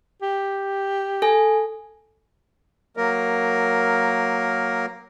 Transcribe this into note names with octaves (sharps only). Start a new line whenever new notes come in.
G4
A4 G#5
F#3 A#3 A#4